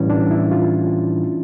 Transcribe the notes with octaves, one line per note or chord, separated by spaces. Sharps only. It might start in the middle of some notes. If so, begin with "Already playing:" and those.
Already playing: A2 E3 G3 C#4
D4
E4
F4